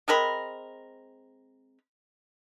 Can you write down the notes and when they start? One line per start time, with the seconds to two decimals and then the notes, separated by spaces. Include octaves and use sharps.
0.08 G#3 C4 A#4 B5